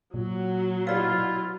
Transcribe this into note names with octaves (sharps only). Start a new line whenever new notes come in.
A#2 F#3
B2 E4 F4 G4 D5 F5